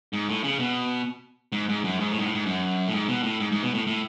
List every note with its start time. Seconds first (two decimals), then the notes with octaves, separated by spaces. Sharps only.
0.13 G#2
0.29 A2
0.44 C#3
0.59 B2
1.52 G#2
1.69 G#2
1.84 F#2
2.00 G#2
2.11 A2
2.19 G#2
2.23 A2
2.34 G#2
2.46 F#2
2.88 A2
2.93 G#2
3.08 B2
3.23 A2
3.40 G#2
3.52 G#2
3.63 B2
3.74 A2
3.87 A2